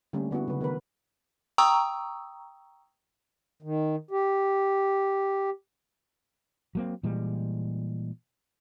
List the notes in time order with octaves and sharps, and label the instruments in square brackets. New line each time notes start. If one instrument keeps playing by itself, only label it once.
[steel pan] D3 G3 A3 A#3 C#4 D4
D3 B3 E4 F#4
C#3 F#3 B4
D#3 B3 A#4 B4
[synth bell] G5 A#5 C#6 D#6 E6
[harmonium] D#3
G4
[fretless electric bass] F#3 A#3 C4
A#2 E3 G3 G#3